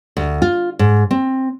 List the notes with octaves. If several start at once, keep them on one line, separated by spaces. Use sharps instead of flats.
D2
F4
G#2
C4